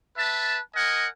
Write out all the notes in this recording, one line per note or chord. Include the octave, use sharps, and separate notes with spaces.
B4 E5 A5
A#4 D#5 F#5 G#5